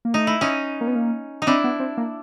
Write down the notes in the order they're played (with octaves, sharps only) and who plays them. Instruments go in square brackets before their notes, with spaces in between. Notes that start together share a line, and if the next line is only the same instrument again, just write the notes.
[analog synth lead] A#3
[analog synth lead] A3 [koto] D#4
[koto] E4
C#4 D#4
[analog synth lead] A#3
B3
A#3
[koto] D#4
[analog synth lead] C4 [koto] D4 E4
[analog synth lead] B3
C4
A#3